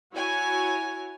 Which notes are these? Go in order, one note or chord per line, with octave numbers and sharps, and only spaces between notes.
E4 F#4 C#5 G#5